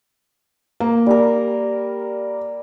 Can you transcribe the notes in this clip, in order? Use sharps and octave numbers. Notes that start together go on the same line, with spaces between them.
A#3
G3 A#4